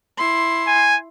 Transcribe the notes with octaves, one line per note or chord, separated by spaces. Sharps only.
E4 C6
G#5